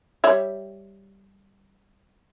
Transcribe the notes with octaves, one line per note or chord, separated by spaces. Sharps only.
G3 C#5 E5